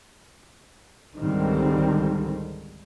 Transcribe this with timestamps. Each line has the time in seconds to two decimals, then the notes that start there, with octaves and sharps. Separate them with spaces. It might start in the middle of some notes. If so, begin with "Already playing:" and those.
1.18 C#2 G#2 D3 D#3 G3 C4